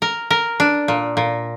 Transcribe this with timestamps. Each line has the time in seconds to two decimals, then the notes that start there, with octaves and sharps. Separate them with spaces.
0.02 A#4
0.30 A#4
0.60 D4
0.88 A#2
1.17 A#2